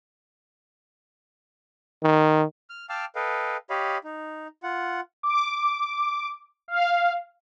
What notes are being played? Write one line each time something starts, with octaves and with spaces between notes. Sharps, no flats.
D#3
F6
F5 G5 A5 D6 E6 F6
A4 B4 D#5 F5 G5
G4 C#5 D#5 F5 B5
D#4
F4 F#5
D6
F5